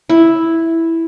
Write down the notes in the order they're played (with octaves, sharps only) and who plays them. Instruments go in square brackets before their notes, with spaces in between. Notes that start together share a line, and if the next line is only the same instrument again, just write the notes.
[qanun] E4